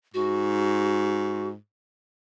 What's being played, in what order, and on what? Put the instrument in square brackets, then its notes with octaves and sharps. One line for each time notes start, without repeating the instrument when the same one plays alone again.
[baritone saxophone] G#2 [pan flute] F#4